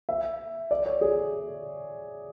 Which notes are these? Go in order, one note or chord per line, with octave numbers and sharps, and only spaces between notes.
E5
D5
C#5
G#4